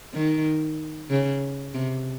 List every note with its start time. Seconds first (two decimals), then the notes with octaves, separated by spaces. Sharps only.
0.14 D#3
1.10 C#3
1.74 C3